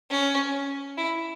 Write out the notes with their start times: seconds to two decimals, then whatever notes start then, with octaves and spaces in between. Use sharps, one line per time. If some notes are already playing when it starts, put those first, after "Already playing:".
0.11 C#4
0.97 E4